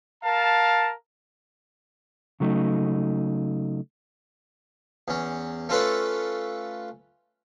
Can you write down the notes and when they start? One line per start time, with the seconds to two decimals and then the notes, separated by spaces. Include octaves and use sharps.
0.24 A#4 F5 A5
2.40 C#3 F#3 A3 D#4
5.08 E2 C#4
5.69 A3 C#4 F4 A4 B4 C#5